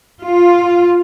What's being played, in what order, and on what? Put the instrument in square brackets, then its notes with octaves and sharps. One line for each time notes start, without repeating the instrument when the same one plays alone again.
[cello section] F4